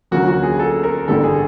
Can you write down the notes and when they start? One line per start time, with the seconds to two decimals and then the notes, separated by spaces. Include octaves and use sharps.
0.11 D2 D3 F#3 A#3 C#4 F#4
0.28 F#4
0.43 G#4
0.59 A4
0.83 A#4
1.08 A1 G2 D3 G3 A4
1.24 G#4